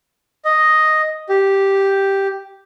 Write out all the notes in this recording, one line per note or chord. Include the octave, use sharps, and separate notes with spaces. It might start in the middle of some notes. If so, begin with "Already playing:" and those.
D#5
G4